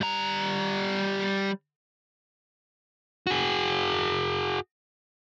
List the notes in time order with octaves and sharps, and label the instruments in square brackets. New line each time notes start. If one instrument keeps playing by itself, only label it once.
[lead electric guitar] G3 A#5
F#4 G#4